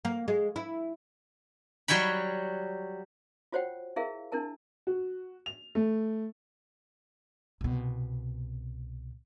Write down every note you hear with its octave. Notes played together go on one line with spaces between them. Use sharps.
A#3
G#3
E4
F#3 G3 C#5 G5 B5
F4 F#4 C5 C#5 F#5 G5
E4 G#4 A#4 E5 F5
D4 E4 A#4 A5
F#4
F7
A3
C2 B2